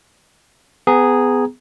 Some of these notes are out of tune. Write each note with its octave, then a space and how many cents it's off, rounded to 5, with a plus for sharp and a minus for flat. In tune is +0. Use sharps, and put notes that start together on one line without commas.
B3 +25 G#4 -5 A#5 +0